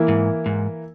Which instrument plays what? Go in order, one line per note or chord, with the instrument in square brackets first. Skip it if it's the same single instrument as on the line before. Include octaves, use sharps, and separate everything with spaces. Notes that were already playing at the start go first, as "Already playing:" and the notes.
Already playing: [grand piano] E3 A#3 E4
[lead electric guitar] G#2
G#2